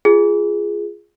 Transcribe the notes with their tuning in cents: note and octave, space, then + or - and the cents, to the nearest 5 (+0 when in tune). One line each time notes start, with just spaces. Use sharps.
F4 -15 G#4 +0